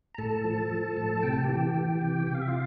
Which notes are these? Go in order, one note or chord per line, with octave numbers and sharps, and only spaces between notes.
A#5
A2 A4 A5
F3
F3
A2
C3 G5
A5
E3 G4 G5
E3
C3
C3 G5
F5
E5
F4 F5